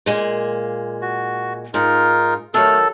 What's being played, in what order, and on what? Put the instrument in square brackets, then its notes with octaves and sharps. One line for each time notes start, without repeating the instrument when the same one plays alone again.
[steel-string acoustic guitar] A#2 G#3 A#3
[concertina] F#4
[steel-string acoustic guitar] G#2 [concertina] D#4 F4 A#4
[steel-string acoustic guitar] D#3 F#3 [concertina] A3 F6 [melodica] A4